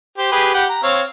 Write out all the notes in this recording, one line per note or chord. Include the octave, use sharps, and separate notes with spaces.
G4 C5
G4 G#4 B4
G4 F#5 G5
A#5
C4 C#5 F5